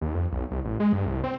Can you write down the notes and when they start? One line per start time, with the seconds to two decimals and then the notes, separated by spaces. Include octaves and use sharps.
0.01 D#2
0.14 F2
0.32 B1
0.51 C2
0.65 A1
0.80 G#3
0.93 G2
1.06 C2
1.24 C4